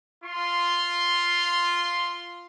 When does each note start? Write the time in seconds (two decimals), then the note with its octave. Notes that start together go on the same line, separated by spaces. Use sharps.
0.24 F4 C6